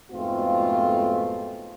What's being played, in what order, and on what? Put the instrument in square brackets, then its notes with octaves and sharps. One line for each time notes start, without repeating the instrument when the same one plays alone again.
[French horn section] F2 G#2 B2 A3 C4 F4